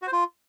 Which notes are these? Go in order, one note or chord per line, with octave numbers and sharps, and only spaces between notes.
F#4
C5
F4